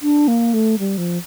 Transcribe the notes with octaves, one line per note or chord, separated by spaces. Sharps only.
D4
A#3
A3
G3
F3